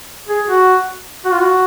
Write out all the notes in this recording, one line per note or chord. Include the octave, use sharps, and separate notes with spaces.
G#4
F#4
F#4
F4
F#4